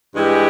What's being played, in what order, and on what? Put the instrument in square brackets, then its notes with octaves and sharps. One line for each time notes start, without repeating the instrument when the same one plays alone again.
[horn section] G2 E3 G#3 E4 G4